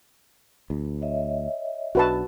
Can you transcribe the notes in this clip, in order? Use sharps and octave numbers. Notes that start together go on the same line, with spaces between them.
D2
C#5 D#5 E5
B1 D4 F#4 B4 A5